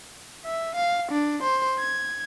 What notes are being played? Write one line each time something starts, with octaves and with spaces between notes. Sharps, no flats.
E5
F5
D4
C5
G#6